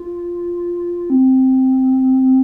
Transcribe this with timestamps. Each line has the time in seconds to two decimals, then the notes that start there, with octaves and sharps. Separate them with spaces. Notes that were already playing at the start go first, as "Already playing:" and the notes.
Already playing: F4
1.10 C4